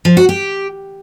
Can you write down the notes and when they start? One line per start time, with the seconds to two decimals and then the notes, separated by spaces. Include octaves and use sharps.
0.05 F3
0.17 F#4
0.29 G4